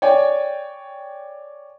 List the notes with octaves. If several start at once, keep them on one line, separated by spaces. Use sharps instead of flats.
C#5 D5 G5 G#5